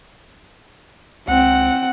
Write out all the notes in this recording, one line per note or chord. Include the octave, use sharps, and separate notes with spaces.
C#2 C4 F#5